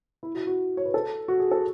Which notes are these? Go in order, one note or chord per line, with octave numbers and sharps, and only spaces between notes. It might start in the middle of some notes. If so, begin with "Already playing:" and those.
E4
F#4
F#4
C#5
B4
A4
F#4
G#4
A4